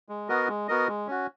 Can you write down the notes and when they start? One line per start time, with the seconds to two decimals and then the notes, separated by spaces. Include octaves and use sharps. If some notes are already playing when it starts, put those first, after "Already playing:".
0.09 G#3
0.29 B3 F#4 A#4 D#5
0.48 G#3
0.68 B3 F#4 A#4 D#5
0.88 G#3
1.07 C#4 F#4